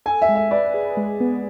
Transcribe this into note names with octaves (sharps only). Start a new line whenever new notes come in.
A4 G#5
E5
G#3
E5
B4 D5
G#4
G#3
B3